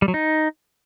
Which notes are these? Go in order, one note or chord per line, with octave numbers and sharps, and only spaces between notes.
G3
F#3
D#4